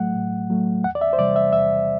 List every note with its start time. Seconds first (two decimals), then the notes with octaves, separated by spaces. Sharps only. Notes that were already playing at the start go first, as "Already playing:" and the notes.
Already playing: A2 F#3 A3 F#5
0.16 A2
0.50 F#3 A3
0.84 E2 F#5
0.95 D5
1.01 E5
1.13 C5
1.18 C3 E3 G3 D5
1.36 E5
1.53 E2 E5